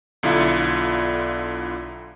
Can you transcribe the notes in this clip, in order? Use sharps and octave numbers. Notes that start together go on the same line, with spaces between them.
B1 D3 E4 F4